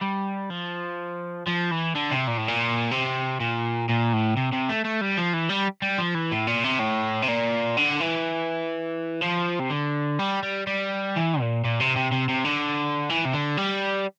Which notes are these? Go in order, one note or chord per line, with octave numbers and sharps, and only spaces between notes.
G3
F3
F3
E3
D3
C3
A#2
A2
A#2
C3
A#2
A#2
A2
C3
C3
A3
A3
G3
F3
E3
G3
G3
F3
E3
A2
A#2
C3
A2
C3
A#2
D3
E3
F3
C3
D3
G3
G3
G3
E3
A#2
A#2
C3
C3
C3
C3
D3
E3
C3
D3
G3